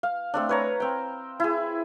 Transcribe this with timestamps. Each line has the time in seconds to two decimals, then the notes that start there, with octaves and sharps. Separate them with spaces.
0.03 F5
0.34 A3 C4 D4
0.49 B4 C#5 A#5
0.80 C4 G5
1.40 E4 G#4